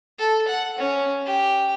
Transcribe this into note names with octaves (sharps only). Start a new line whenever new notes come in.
A4
F#5
C#4
G4